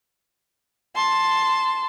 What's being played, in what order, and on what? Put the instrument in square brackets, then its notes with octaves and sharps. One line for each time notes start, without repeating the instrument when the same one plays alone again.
[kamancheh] A5 C6